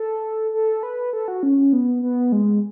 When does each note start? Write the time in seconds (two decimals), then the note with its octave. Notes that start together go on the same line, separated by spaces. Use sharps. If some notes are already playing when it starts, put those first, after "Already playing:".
Already playing: A4
0.53 A4
0.83 B4
1.13 A4
1.28 F#4
1.43 C#4
1.58 C#4
1.73 B3
2.03 B3
2.32 G#3